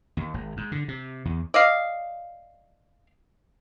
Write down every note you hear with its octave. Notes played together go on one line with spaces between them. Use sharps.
D#2
G#1
G#2
D3
C3
E2
D5 D#5 F5